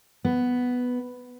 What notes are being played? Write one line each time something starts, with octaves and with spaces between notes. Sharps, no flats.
B3